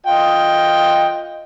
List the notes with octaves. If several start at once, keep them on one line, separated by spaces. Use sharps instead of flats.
F4 D#5 G5